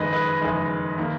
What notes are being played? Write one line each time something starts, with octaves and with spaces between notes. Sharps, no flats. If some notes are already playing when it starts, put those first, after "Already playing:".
Already playing: F#1 F2 D#3 G#3 B4 D#5
B4 D#5
F#1 F2 D#3 G#3
D#3 A#3